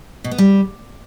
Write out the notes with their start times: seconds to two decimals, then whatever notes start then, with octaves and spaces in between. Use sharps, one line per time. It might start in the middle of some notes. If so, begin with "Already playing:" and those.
0.24 B2
0.31 B3
0.38 G3